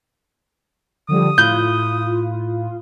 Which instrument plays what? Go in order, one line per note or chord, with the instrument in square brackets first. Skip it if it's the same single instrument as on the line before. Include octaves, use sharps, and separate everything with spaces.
[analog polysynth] D3 F3 G3 [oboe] D#6
[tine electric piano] A2 B5 F#6 [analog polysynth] F4 [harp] G6